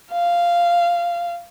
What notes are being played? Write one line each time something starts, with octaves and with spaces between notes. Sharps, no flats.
F5